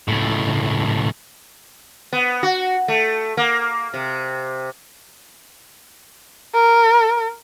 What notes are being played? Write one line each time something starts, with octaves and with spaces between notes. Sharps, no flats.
C#2 A2
B3
F#4
A3
A#3
C3
A#4